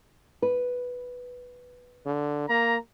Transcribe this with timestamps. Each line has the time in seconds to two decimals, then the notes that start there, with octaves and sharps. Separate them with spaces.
0.42 B4
2.05 D3
2.49 A#3 A#5